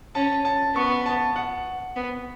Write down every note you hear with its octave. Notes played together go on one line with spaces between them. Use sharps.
C#4 A5
A5
B3 C#6
A5
F#5
B3